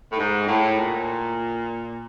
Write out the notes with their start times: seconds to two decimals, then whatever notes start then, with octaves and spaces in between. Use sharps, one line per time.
0.10 A2
0.18 G#2
0.46 A2
0.76 A#2